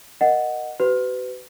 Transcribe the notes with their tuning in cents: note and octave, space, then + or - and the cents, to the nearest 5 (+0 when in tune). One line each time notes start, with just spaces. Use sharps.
A#4 +10 D#5 -5 F#5 +0
F#4 +45 B4 +30